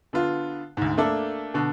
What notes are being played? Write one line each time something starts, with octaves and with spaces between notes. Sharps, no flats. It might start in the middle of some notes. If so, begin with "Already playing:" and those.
D3 B3 F4
D2 G#2
A3 A#3 D4 A4
B2 D3